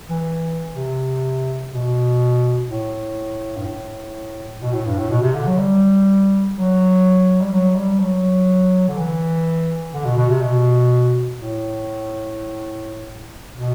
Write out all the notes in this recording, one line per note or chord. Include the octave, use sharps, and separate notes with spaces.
E3
C3
B2
A2
G2
A2
B2
A2
G2
A2
B2
C3
D3
F#3
G3
F#3
G3
F#3
G3
F#3
D3
E3
D3
B2
B2
C3
B2
A2
B2